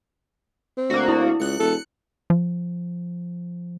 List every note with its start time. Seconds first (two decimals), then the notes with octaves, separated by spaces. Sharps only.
0.77 C4
0.90 D2 A#3 F#4
1.08 E4
1.40 C#2 F#6 C#7
1.60 E1 A4
2.30 F3